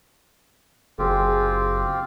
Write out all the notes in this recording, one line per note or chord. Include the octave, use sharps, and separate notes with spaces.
F#1 C4 F4 G4 G#4